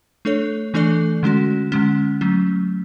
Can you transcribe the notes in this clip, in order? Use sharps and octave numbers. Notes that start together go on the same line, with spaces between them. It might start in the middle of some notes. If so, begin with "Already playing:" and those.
A3 D4 A4 C#5
E3 A3 D4 A4 D5
D3 G#3 C#4 F#4
D3 G#3 C#4
F#3 A3 C#4